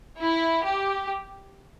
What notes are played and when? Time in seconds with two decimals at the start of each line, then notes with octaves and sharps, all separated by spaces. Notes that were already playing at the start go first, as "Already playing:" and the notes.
0.21 E4
0.65 G4